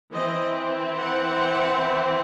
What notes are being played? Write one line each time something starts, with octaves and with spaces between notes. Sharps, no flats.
E3 C4 D#5
F#5